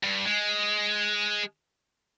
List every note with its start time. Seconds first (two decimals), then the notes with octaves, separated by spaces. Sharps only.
0.03 G2
0.25 G#3